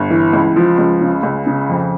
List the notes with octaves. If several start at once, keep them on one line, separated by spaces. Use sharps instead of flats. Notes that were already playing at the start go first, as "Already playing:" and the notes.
Already playing: G1
E3
C#2
F3
C#2
C#3
C#2
C#3
F2